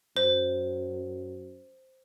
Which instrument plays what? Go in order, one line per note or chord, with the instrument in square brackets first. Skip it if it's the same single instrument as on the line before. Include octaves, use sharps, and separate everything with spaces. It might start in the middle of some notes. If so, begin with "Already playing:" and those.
[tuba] F#2 [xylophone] C5